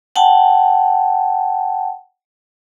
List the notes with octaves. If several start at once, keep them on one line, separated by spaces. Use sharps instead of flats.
F#5 G5 A5